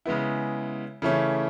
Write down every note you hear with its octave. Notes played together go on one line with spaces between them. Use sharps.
C#3 G#3 B3 E4
C#3 E3 A3 C#4